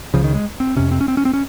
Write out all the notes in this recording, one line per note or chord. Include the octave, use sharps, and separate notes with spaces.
C#2 C#3 F3
D#3
G#3
C4
F2 C3 C#4
C4
C#4
C4
C#4
C4
C#4